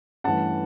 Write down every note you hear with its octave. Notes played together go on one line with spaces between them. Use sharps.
G2 E3 A3 C#4 F#5 A5